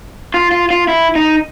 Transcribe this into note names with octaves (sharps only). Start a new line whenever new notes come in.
F4
F4
F4
E4
D#4